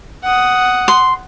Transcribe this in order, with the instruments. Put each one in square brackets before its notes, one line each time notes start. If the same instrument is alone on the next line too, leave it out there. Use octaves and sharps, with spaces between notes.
[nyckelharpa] F#5 D#6
[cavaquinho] C6